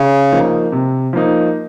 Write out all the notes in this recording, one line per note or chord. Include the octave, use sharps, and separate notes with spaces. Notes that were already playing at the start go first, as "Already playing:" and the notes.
Already playing: C#3
F3 A#3 D#4
C3
F3 A#3 D#4